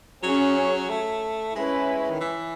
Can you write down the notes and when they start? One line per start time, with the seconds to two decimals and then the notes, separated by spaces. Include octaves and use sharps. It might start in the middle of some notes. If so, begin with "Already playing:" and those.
0.23 F#3 C#4 G#4 C#5
0.90 A3
1.55 G#3 C#4 E4 B4
2.10 D#3
2.21 E3